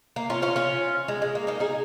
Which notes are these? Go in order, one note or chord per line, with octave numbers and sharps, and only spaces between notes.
A#3
C#4 F4
C#4 F4
C#4 F4
G#3
G#3
A#3
A#3 D#4
D#4 G#4